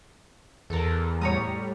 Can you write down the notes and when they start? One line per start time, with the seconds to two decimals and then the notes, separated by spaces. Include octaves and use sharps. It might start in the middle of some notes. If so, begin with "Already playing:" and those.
0.70 E2 A4 A#4
1.21 A2 G3 C#5 A#5 D#6